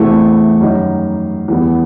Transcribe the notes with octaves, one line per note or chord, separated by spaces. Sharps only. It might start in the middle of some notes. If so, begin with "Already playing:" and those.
Already playing: E2 C3 E3 A3 C4
F#2 D#3 G3 D#4
E2 D#3 G3 B3